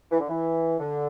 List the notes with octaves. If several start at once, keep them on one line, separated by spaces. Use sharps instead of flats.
E3
D3
E3
D3